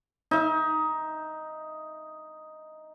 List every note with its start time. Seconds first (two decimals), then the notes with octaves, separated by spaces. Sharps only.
0.31 D#4 E5